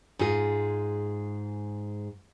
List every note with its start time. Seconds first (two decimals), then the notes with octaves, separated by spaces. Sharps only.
0.19 G#2 G#3 F4 G#4